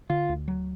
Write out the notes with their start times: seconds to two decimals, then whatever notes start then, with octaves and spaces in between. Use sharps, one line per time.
0.09 D3 F4
0.29 D2
0.48 F#3